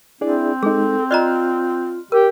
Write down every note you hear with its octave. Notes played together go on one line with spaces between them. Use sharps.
C4 D4 E4 G#4 D5
G#3 D#4 G#4 A4
F4 D5 D#5 A#5 C6 F6 F#6
G4 A#4